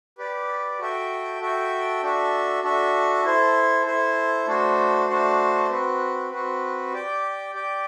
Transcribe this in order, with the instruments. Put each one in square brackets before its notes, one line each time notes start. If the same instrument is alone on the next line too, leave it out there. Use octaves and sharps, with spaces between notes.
[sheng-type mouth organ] G4 B4 D5
F#4 A4 E5 G5
F#4 A4 E5 G5
D4 F#4 A4 E5
D4 F#4 A4 E5
E4 A4 C5
E4 A4 C5
A3 D4 F#4 C5
A3 D4 F#4 C5
C4 F#4 B4
C4 F#4 B4
G4 D5 G5
G4 D5 G5